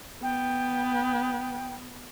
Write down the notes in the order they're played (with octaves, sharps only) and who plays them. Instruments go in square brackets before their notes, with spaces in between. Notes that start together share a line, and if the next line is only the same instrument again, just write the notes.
[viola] B3 [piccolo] G5